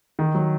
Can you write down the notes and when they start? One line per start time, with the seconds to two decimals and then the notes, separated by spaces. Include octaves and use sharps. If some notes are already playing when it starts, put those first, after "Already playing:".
0.19 D#3
0.35 F#3